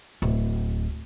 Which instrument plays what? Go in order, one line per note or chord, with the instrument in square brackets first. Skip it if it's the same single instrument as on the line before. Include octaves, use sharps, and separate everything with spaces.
[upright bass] D1